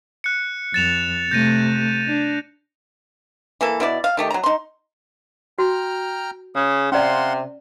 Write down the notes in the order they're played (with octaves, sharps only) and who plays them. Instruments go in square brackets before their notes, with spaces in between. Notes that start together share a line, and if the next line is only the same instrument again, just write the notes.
[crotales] F#6 C#7
[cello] F2 [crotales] A6 E7 F7
[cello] C3 A3 [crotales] G6 A#6 D#7
[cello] D4
[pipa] E3 A#3 A4
B2 E4 D5
F5
D#3 A3 G4
F#3 A#5
D#4 C6
[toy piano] F#4 [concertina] G5 A#5 F6
[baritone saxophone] C#3 [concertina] G#4
[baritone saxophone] C3 [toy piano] C#4 D5 [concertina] F5 F#5 C6